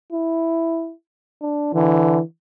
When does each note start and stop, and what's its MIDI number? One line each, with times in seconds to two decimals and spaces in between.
0.12 0.92 64
1.42 1.71 62
1.74 2.18 50
1.74 2.21 52